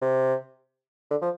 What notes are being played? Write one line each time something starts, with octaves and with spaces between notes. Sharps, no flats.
C3
D3
F3